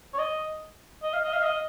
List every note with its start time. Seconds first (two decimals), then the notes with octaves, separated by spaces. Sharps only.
0.14 C#5
0.19 D#5
1.03 D#5
1.14 F5
1.23 D#5
1.33 F5
1.43 D#5